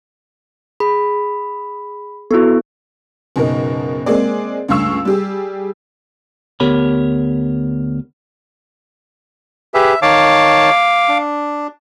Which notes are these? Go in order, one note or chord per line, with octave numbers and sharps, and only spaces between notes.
G#4 B5
B3 E4 F#4 A4
F#1 B2 D#4 A#4
G#3 A#3 C4 G#4 D5
C#2 G2 A3 F5 C#6 E6
G3 G4 G#4
D2 B3 G4 A#4 C#5 B5
G4 G#4 B4 E5
D#3 C#5 F5 A5 D6
D4